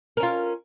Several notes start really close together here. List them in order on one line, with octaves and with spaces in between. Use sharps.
A#4 C#4 F4